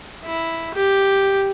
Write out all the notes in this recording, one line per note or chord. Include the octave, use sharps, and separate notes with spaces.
E4
G4